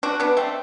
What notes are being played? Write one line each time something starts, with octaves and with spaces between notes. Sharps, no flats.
D4 F#4
B3 D4
A3 C4